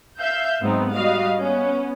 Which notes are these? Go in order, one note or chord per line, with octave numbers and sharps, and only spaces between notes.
E5 F5 G6
G#2 F#3 B3 C4 D#4
G3 F#4 D#5 F5
B3 C#4